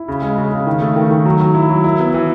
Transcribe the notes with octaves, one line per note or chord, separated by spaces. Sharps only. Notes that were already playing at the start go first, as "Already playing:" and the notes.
Already playing: E4
C#3
G#3
C#3
C#3
D#3
A3
D#3
D#3
F#3
F#3
E4
F#3
E4
B3
E3